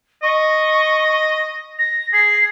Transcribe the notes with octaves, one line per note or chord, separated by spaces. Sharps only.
D#5 C#6
A#6
G#4 C7